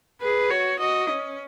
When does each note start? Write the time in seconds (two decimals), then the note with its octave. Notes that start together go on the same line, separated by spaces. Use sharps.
0.22 G#4 B4
0.50 F#4 C#5
0.79 F#4 D#5
1.08 C#4